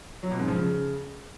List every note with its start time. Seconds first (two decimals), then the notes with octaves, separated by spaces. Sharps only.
0.23 F#3
0.31 B2
0.39 G#2
0.48 F3
0.56 C#3